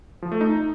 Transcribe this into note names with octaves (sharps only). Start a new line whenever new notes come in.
F3
A3
D#4